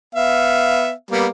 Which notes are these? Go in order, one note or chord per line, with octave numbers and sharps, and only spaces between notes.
B3 E5 F5
G3 A#3 B3